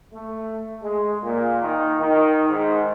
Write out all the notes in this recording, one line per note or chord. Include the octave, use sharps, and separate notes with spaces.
A3
G#3
A#2
D#3
D#3
G#2